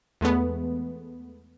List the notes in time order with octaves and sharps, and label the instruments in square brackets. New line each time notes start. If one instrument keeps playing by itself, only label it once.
[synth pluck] E2 G#3 A3 B3